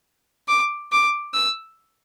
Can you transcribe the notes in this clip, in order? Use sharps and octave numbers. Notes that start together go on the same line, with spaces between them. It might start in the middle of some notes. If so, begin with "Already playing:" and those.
D6
D6
E6